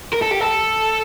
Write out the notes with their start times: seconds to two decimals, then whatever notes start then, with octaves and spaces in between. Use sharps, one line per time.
0.13 A#4
0.22 A4
0.31 G4
0.40 A4